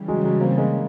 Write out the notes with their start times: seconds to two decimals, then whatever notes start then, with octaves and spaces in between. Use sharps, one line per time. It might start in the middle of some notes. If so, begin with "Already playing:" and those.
Already playing: C#3 E3 G3
0.08 F#3 G#3
0.24 F#3 G#3
0.41 A#3 C4
0.57 G#3 A#3